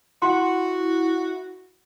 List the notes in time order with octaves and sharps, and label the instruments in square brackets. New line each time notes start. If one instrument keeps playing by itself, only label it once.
[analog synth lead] E4 [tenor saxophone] F#4 [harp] F#5 B5 [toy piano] C6